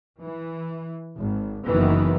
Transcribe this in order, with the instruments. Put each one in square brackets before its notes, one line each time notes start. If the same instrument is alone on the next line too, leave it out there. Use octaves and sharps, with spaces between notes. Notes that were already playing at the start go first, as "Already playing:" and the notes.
[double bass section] E3
G#1
F#1 D#3 E3 F#3 B3